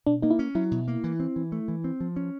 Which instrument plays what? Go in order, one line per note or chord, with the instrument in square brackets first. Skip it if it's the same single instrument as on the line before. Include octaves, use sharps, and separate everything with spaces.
[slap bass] B2 [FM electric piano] D4
[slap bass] A#3 [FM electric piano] D#4
[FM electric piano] E4
[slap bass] C#4
[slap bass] F#3 [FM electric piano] E4
[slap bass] B2
A#3
E3
C4
E3
A3
E3
C4
F3
C#4